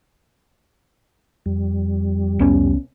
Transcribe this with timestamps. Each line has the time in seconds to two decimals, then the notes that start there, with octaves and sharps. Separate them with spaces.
1.46 F2 G3
2.39 C2 B3 C#4